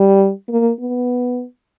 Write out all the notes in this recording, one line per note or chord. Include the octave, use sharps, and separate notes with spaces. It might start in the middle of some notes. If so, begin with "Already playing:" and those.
Already playing: G3
A#3
B3